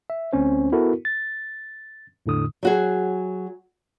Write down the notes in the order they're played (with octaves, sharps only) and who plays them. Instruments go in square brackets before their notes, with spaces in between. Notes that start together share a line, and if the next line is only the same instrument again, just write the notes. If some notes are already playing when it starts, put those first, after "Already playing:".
[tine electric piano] E5
D2 C4 C#4 C5
B3 E4 F#4 A4 A#4
A6
E2 A2 D3 D#6
[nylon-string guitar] F#3 F#4 G#4